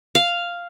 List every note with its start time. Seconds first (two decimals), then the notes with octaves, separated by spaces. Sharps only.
0.15 F5